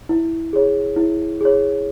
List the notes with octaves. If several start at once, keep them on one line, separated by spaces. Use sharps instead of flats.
E4
G#4 C#5
E4
G#4 C#5